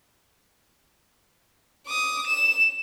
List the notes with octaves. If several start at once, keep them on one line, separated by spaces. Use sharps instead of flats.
D6 D#6
E7